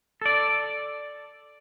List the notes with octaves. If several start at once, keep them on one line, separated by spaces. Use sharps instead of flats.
A4 D5